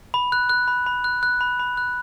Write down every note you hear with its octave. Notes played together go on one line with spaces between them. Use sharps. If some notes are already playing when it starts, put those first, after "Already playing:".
B5
F#6
F#6
B5
B5
F#6
F#6
B5
B5
F#6